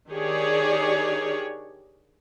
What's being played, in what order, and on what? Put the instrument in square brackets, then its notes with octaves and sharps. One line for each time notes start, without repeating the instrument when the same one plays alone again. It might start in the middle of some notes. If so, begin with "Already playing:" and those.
[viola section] D#3 D4 G4 G#4 C#5 D5